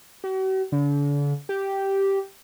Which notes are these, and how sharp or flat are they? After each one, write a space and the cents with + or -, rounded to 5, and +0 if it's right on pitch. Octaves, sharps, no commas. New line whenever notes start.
F#4 +45
D3 -40
G4 -5